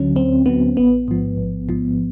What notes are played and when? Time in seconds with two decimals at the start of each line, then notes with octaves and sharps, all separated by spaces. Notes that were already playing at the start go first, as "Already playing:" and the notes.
Already playing: D2 D3 F#3 C#4
0.16 D2 C4
0.46 D3 F#3 B3
0.77 A1 B3
1.08 G#2 F3
1.38 A1
1.69 G#2 F3